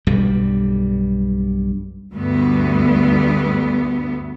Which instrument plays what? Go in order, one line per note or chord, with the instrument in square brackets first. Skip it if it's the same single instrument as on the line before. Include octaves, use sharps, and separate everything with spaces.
[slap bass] B1 G2 G3
[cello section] D2 G2 B3